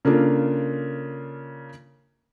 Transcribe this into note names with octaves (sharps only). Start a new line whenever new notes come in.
C#3 A#3 D4 F4 A4